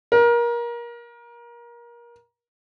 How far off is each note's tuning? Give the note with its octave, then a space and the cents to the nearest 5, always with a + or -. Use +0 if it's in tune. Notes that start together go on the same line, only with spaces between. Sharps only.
A#4 +25